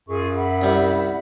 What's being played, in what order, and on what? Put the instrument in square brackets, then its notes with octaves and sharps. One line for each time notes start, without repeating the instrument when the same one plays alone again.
[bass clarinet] F#2 [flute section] F4 G#4 C#6
[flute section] E5 F#5 B5
[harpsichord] C2 G3